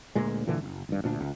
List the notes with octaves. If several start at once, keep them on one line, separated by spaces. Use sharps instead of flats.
D2 A#2 G#3
G2 A#2 D3 E3
F#1
G#1 G2
D2 A#2 D4
C#2